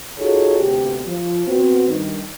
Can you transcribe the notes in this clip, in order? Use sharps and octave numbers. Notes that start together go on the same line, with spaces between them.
D#4 F4 F#4 G#4 A4 C#5
D2 C3 B3 G4
F3
B3 C4 F#4
G2 D#3